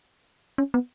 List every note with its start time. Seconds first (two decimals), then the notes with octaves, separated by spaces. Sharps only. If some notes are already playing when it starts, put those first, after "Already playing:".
0.58 C#4
0.74 B3